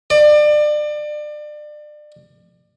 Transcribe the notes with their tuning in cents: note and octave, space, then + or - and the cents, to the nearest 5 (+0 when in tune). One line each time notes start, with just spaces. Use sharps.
D5 +30